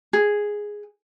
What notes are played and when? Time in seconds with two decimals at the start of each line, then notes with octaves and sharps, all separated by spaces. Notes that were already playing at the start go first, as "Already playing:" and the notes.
0.13 G#4